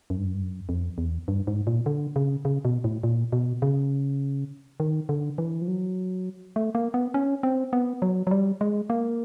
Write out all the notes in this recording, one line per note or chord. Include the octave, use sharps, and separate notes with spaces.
F#2
G2
F#2
G2
F#2
F2
E2
G2
G#2
A#2
D3
C#3
C#3
B2
A2
A#2
B2
C#3
D#3
D3
E3
F3
F#3
A3
A#3
B3
C#4
C4
B3
F#3
F#3
G3
G#3
A#3